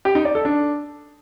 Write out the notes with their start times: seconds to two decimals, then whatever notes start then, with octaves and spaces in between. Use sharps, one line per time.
0.05 G4
0.15 D#4
0.25 D5
0.35 A4
0.45 D4